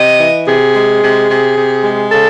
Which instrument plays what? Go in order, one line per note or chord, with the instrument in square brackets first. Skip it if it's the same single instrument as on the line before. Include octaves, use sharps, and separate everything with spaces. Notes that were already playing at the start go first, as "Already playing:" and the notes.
Already playing: [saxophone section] C3 D#5
E3
C3 G#4
G#3
C3
C3
C3
G#3
C#3 A4